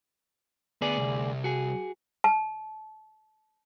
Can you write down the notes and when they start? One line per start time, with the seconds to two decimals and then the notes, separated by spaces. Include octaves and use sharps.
0.82 D2 B3 G#4 D5
0.97 C2
1.44 F#4 G#4
2.24 A5